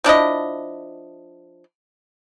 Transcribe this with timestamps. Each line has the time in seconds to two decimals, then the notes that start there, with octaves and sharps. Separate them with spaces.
0.04 F3 D4 E4 D#5